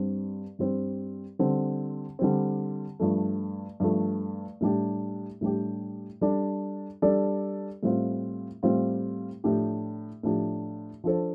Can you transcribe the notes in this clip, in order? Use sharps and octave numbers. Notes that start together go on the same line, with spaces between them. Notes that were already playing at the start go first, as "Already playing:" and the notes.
Already playing: G2 G3 C4
G2 G3 C4
D3 G3 C4
D3 G3 C4
G2 F3 A3
G2 F3 A3
A2 G3 D4 G4
A2 G3 D4 G4
G3 D4 A4 D5
G3 D4 A4 D5
A2 G3 C4 F4
A2 G3 C4 F4
A2 F3 D4 G4
A2 F3 D4 G4
F3 D4 A4 C5